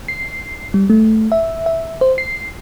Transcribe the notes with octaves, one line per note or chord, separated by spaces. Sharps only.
C7
G3
A3
E5
E5
C5
C7